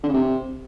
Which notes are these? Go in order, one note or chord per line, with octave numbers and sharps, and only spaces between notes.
D3
C#3
C3